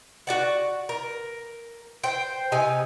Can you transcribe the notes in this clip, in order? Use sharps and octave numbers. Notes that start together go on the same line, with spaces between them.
F#4 D5 F#5
A#4
C5 G5
C3 D#4 G#5